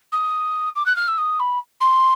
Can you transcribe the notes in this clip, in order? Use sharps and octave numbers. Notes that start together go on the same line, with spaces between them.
D#6
D6
F#6
F6
E6
D#6
B5
C6